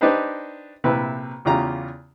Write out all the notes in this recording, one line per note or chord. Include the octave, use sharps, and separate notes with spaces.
D4 D#4 G4 B4 C5 D#5
A#1 C3 E4 B4
E2 C#3 F4 G4 A#5